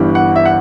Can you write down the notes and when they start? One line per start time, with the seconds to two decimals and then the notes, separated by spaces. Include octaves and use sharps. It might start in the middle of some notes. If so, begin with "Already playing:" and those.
Already playing: G1 G2 E3 G3
0.15 F#5
0.36 E5
0.46 F#5